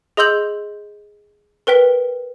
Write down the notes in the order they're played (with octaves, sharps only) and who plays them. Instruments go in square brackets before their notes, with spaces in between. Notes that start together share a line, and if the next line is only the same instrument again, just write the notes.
[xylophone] G#4 D#5 C6 E6 G6 F#7
A#4 B4 G5 B6